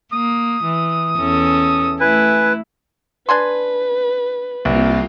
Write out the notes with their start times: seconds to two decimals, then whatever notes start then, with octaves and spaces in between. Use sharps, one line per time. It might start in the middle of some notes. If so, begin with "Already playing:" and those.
0.13 A#3 D#6
0.63 E3
1.17 E2 C#4 A4
2.00 A3 E4 B4 G#5
3.29 D4 B4 G#5 C6
4.65 C2 A#3 C4 F4